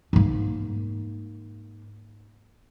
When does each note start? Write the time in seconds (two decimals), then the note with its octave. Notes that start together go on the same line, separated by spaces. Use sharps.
0.13 G#2 A#3